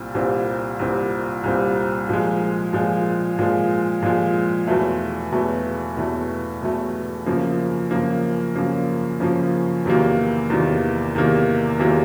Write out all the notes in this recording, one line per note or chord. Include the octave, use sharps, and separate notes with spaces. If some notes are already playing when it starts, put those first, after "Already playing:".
Already playing: C2 A#2 G3 C4
C2 A#2 G3 C4
C2 A#2 G3 C4
C2 A#2 G3 C4
A#2 F3 G#3
A#2 F3 G#3
A#2 F3 G#3
A#2 F3 G#3
E2 B2 F#3 A3
E2 B2 F#3 A3
E2 B2 F#3 A3
E2 B2 F#3 A3
F#2 C#3 F3 A#3
F#2 C#3 F3 A#3
F#2 C#3 F3 A#3
F#2 C#3 F3 A#3
E2 C3 D#3 F#3 A#3
E2 C3 D#3 F#3 A#3
E2 C3 D#3 F#3 A#3
E2 C3 D#3 F#3 A#3